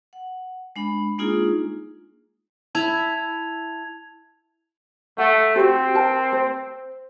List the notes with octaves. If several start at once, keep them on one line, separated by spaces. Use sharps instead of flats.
F#5
G#3 D4 B5
G#3 A#3 D4 D#4 F4 G#4
E4 A5 G#6 F7
A3 F#5
C4 F#4 G4
A#4 G5 A5
C5